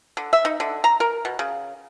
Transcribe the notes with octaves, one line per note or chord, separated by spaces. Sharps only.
D3
E5
D#4
D3
A#5
A#4
B2
C#3